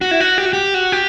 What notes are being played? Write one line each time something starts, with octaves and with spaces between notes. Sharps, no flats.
F#4
E4
F#4
G4
F#4
G4
F#4
G4